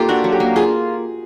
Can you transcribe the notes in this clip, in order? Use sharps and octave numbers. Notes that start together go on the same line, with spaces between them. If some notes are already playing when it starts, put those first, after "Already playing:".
Already playing: A#3 F4 G4 A4
D4 F#4
F#3
G4
A#3
F4 G#4